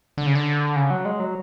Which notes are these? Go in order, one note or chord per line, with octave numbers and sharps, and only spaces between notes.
D3
C#3
D3
C#3
F#3
G#3
F#3